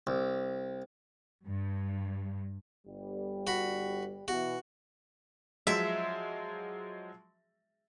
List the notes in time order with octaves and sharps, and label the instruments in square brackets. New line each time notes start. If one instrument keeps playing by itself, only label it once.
[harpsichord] C2
[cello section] G2
[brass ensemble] G1 G3
[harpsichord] F#4 B5
[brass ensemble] B2 E3 [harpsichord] F#4
[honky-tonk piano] F3 F#3 G#3 [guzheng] E5